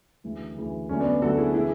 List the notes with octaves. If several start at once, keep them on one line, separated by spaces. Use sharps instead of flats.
D2 C#3 E3
D2 C#3 E3
D2 D3 F#3 C#4
B3 D4
D2 D3 F#3 F#4 A4
E4 G#4
C#3 E3 E4 G#4